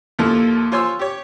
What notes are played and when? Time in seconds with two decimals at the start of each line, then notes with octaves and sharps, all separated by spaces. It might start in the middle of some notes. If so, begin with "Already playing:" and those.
0.19 D#2 A#2 F3 A#3 E4 A4
0.72 F4 C5 C#5 G#5 C6 E6
0.99 G4 C#5